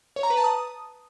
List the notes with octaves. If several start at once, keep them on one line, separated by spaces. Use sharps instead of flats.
C#5
A#5
B4
A5
D#6